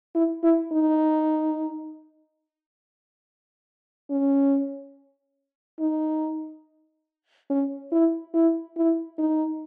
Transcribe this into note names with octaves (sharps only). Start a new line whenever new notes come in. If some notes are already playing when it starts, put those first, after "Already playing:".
E4
E4
D#4
C#4
D#4
C#4
E4
E4
E4
D#4